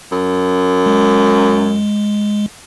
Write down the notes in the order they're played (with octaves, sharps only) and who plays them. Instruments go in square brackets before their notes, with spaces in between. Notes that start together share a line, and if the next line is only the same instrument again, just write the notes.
[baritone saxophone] F#2
[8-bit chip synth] G#3